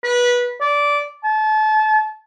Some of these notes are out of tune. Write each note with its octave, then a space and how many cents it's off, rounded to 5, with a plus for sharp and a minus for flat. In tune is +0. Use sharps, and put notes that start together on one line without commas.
B4 -20
D5 -15
A5 -30